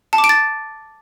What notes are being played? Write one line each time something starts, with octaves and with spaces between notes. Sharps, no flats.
A5
D6
D7
A6